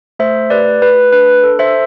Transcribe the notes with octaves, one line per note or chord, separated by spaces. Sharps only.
A3 C5 E5
G4 B4 D5
A3 B4
D4 B4
A4
C5 E5